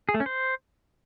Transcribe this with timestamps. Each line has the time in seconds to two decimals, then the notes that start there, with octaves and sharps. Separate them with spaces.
0.09 G#4
0.14 A3
0.20 C#4
0.26 C5